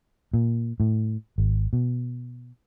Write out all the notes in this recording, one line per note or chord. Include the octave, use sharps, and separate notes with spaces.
A#2
A2
G#1
B2